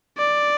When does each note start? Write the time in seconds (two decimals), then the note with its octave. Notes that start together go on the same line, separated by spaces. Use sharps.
0.18 D5